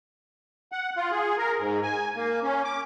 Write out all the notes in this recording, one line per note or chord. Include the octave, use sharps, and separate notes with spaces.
F#5
F4
G#4
A#4
G#2
G#5
A#3
C#4
D6